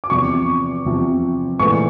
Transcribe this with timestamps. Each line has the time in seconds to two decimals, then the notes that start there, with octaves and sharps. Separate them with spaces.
0.04 D6
0.10 E2 C3 F3 C#6
0.85 E2 C3 F3
1.59 A#1 G#2 E3 A3 C#6